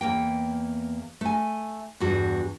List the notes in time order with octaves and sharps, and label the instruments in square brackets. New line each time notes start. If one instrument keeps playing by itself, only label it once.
[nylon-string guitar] E2 A#3 G5
A3 G#5
E2 G2 F#4